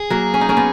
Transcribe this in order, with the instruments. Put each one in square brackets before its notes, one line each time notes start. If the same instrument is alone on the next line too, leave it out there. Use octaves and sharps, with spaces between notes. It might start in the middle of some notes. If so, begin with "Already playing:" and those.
Already playing: [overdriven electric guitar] G#4
[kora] F#3 A#3
C#4
D#4
A#3 C#4
B3 D#4